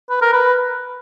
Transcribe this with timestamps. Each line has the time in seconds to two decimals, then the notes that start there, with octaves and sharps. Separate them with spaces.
0.10 B4
0.21 A#4
0.33 B4